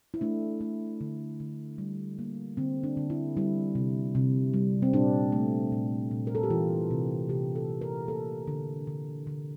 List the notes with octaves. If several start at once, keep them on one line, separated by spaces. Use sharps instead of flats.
E4
A3 D4
A3
D3
D3
G3
A#3
D3 C4
D4
D3
E4
G3 E4
C3
C3
G3
C4
A#2 D4
A3
A#2
A#2
A#4
A4
G4
E3 F4
C3
C3 G4
A4
C3
A#4
A#3 A4
D3
D3
D3